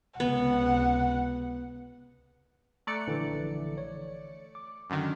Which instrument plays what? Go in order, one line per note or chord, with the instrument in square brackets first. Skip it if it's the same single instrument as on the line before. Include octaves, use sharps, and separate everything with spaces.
[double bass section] C#2 C3 [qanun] B3 [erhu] F#5
[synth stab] A3 D5 C#7 [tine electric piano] A#5 F#6
[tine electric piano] A#1 D3 E3
C#5
D6
[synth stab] F#2 D3 D#3